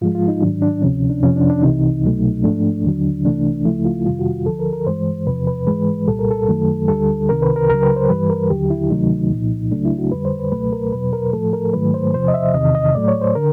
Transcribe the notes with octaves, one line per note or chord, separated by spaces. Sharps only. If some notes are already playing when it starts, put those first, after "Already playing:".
G#2 F3 G#3 F4
F4
D#4
G#2 D#3 F#3 D4
D4
D2 C3 F3 C#4
D4
F2 C3 F3 C#4
D4
D4
C2 C3 E3 D#4
C2 B2 F#3 A3
G#2 F3 A3 D4
D#2 D3 F#3
C2 C3 E3 A3 D4
C#2 C#3 F3 A3 E4
F4
F2 C3 D#3 G3 F4
F#4
D2 D3 F3 A4
A#4
A#4
G2 E3 G#3 C5
E2 C3 F3 B4
B4
G#2 E3 G#3 B4
C2 A#2 G3 A4
A#4
A4
F#2 D#3 F#3 A3
D2 D3 G3 A4
C2 C3 D#3 A#4
B4
A#4
C#2 C#3 F#3 A#4
B4
C5
G2 E3 G3 B4
A#4
D#2 D3 F#3 G4
E4
D2 C3 D#3 F#3 A3 D#4
C2 A#2 F3
C#2 C#3 F#3 A3 D4
E4
F#4
F2 D3 G3 B4
C5
B4
C#2 B2 F#3 A3 B4
A#4
E2 B2 F#3 B4
A#4
A2 F3 A3 A4
A#4
G#2 D#3 F#3 A3 B4
C5
E2 C3 F3 C5
D#5
E5
E2 C3 D#3 D#5
D#5
A2 F#3 A3 D5
C#5
C5
D3 A#4